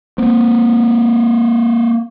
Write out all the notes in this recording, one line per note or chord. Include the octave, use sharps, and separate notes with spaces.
A#3 C4